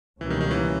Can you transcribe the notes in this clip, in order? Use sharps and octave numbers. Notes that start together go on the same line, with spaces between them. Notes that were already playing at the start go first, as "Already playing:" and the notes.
C#2 B2 E3 G3 A#3 C#4
D#3
D#3
E3